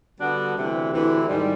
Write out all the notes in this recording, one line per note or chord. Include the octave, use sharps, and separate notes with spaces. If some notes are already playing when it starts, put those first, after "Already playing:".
D3 G3 B3 D4 F#4
D2 C3 E3
D2 C3 E3
G#2 D#3 G3